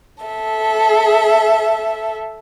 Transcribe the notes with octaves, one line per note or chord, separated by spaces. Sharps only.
A4 E5